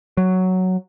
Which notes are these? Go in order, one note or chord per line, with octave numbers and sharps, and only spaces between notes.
F#3